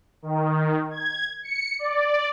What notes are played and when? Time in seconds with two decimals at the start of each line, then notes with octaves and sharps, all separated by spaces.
0.22 D#3
0.91 G#6
1.43 C#7
1.79 D5